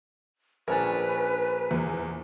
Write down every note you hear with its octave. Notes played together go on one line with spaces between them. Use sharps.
A#1 C#4 D4 A#4 B4
E2